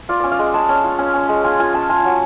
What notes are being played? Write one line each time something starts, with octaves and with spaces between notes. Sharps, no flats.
F4 D5
C#4 D5
F5
G#3
G#3 A5
C#4
F4
C#4
C#4
G#3
F4 G#5
F4 G#5
C#4 A5
F4 G#5
F#3